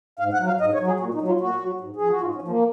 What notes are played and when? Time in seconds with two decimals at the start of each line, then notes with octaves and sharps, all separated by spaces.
0.19 G#2 F5
0.33 F#5
0.39 F#3
0.47 F5
0.60 G#2 D#5
0.73 C#5
0.80 F#3
0.87 G#4
1.00 A#2 F#4
1.14 D#4
1.21 F#3
1.28 F4
1.40 A#2 F#4
1.62 F#3
1.81 G#2
1.96 F3 G#4
2.09 F#4
2.21 G#2 F4
2.35 C#4
2.42 F3
2.48 A#3